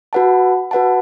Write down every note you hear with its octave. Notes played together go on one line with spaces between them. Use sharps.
F#4 B4 F#5 A5
F#4 B4 F#5 A5